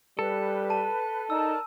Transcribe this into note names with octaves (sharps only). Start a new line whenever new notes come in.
G3 A4 B4
A5 D#7
D#4 A#4 D5 A5 E6